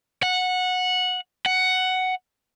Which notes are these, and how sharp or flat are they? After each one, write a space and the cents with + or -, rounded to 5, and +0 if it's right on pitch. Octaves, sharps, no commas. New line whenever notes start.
F#5 -15
F#5 +5